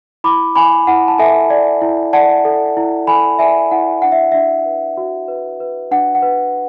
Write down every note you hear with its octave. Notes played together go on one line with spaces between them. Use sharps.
E4 B5 D6
E4 G#5 B5
E4 F#5
A5
A4 E5 G#5
D5
E4
D5 F#5 A5
A4
E4
A4 G#5 B5
D5 E5 G#5
E4 F#5
D4 F#5
E5
D4 E5
B4
F#4
B4
B4
D4 F#5
F#5
B4